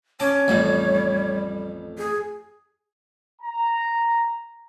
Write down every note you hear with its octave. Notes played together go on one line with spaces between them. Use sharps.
C#4 C#5 A5 D6
A1 F2 G3
G#4
A#5